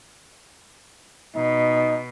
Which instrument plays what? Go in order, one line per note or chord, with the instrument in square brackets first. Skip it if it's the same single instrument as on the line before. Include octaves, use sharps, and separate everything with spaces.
[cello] B2 [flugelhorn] D#4